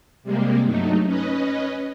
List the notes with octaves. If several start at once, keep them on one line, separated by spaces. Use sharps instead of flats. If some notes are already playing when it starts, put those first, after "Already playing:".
C3 G3 G#3 A#3
G2 F#3 A3 D#4
C#4 B4 D#5